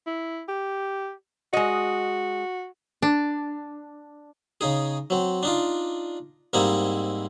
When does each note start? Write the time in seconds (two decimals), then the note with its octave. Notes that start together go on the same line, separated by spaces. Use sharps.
0.07 E4
0.48 G4
1.53 G#3 F#4 D#5
3.02 D4
4.61 C#3 D#4 G#4
5.10 F#3 C4
5.43 D4 D#4 F4
6.53 G#2 G3 A#3 C4 D#4 E4